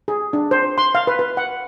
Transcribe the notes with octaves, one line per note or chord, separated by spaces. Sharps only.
G#4
D4
C5
C6
F5
B4
B4
F#5